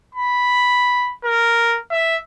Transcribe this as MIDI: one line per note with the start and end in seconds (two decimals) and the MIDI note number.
0.15 1.14 83
1.25 1.79 70
1.91 2.17 76